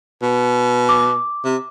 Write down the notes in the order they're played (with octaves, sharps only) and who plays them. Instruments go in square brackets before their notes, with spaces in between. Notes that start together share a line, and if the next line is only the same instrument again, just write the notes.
[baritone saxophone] B2
[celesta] D6
[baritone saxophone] C3